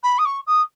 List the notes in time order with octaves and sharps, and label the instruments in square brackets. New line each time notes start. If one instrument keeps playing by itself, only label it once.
[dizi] B5
D#6
C#6
D#6